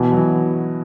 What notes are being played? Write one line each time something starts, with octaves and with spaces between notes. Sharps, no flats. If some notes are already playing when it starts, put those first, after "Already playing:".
Already playing: B2 E3
F#3
E3